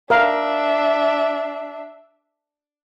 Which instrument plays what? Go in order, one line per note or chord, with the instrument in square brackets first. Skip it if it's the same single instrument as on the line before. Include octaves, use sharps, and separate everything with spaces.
[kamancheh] D4 E5 [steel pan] A#4 F5